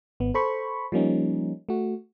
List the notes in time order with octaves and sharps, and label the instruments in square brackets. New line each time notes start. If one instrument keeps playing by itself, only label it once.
[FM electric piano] G#1 B3
A4 C5 B5 C#6
F3 G3 A#3 C#4 D#4
A3 F#4